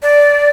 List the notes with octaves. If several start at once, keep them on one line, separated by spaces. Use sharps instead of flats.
D5